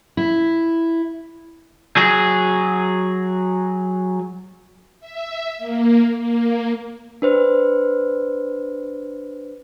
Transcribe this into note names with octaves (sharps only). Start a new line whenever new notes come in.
E4
F#3 G#4
E5
A#3
A#3
D4 B4 C5